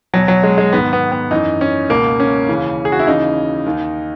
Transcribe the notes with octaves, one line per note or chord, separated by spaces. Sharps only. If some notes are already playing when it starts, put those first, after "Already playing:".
E2 B2 F#3
F#3
G#3
G#3
G#2 D#3 B3
B3
B3
F#2 E3 D#4
C#4
C#2 B2 A#3
C#4
D#2 C#3 E3
G#4
F#4
E4
D#2 C#3 E3 D#4
D#2 D#3